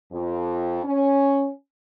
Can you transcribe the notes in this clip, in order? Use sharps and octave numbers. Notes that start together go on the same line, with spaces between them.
F2
C#4